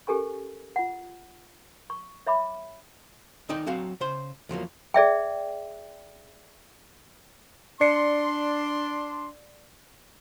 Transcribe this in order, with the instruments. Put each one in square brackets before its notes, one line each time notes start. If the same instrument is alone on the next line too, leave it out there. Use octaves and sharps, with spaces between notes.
[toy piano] C#4 G4 A4 A#4 G#5 C#6
F4 F#5
C#6
C#5 E5 B5 D6
[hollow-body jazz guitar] D2 D#3 D#4 D5 G5
F#3 C4 F#4 F5
C#3 C5 C6
E2 F3 F#3 A#3
[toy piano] G#4 D5 E5 G5
[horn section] D4 C6 [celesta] D5 C7 C#7